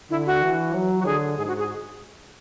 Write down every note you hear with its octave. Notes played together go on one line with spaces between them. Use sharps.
D3 E4
F#4
E3
F#3
F#4
D3 G#4
G#2 G#4
F#4
G#4